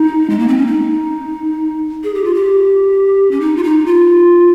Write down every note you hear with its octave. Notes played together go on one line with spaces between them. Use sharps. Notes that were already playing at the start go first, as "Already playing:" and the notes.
Already playing: D#4
G#3
A#3
C4
C#4
D#4
G#4
G4
F4
G4
C#4
D#4
F4
D#4
F4